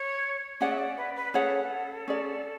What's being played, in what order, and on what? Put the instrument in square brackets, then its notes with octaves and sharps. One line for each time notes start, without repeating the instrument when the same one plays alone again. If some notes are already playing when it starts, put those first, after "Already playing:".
Already playing: [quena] C#5
[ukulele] C#4 G#4 C#5 F#5 [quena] D5
[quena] E5
D5
B4
B4
[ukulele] C#4 G#4 C#5 F#5 [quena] A4
[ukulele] C#4 G#4 D5